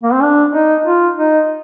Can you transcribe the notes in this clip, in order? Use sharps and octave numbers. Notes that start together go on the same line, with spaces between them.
A#3
C4
D4
D#4
F4
D#4